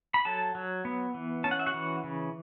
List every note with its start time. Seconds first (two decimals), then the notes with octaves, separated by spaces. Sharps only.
0.14 B5
0.25 F#3 A4 A5
0.55 F#3
0.85 B3
1.14 E3
1.44 C#4 A5
1.51 F#5
1.59 E5
1.66 F#4 F#5
1.74 E3
2.04 C#3